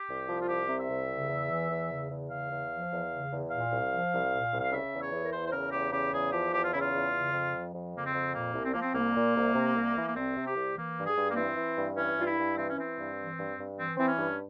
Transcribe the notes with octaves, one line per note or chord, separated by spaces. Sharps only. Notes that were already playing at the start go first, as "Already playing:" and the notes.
Already playing: G4
C2
F3
F4
C2 G4
C3
E5
C2
C#3
E2
E3
E2
C#3
E2
C#3 F5
E2
F3
E2
C#3
E2
A#2 F5
C2
F3
C2
A#2
C2
F5
C#3 E5
E2
C#5
E3 G#4
A#4
E2 C5
C5
C#3 A#4
E2 G4
C#3 G4
E2 G#4
F3 G4
E2 G4
F4
C#3 E4
F4
E2
C#3
F2
F3
F2
C#3 A#3
C4
F2
A#2 A#3
C2
C4
F3 A#3
C4
C2 A#3
A#2
C2
C3
C2
E3
A#3
C2 C4
C3
G4
C2
E3 A#3
G2
G#4
G2
A#3
E3 C4
E3
G2
E3 C#4
G2 F4
E4
G2
E3 C4
C#4
E3 C4
G2
E3
G2
G2
E3 C4
E3 C4
C#4
G2